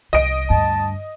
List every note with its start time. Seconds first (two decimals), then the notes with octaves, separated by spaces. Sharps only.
0.13 C2 D#5 D7
0.50 D2 G2 A5